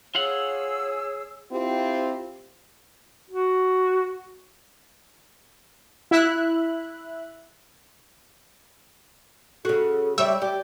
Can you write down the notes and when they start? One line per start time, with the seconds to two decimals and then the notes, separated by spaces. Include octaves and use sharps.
0.15 F4 G#4 C#5 F5 F#5 E6
1.52 C4 E4 F4 G4
3.30 F#4
6.11 E4 E5 F#6
9.65 C#3 F#4 A4
10.18 G3 C#5 D5 E5
10.42 G4 D5